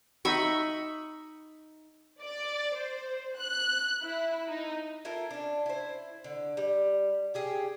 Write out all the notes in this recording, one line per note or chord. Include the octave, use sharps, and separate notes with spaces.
D#4 E5 B5 C#6
D5
C5
F#6
E4
D#4
E4 F4 A4 A#4
C#4 D4
E4 C5
D3
G3
C#4 G4 G#4